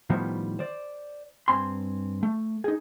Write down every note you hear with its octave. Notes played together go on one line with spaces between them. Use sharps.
A2 D#3 F3 G3 B3 C5
C5 D5
G2 C4 G#5 C6
A3
D#4 G#4